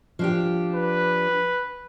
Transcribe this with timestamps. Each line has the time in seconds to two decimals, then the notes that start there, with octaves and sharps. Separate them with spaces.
0.19 F3 D4 G4
0.75 B4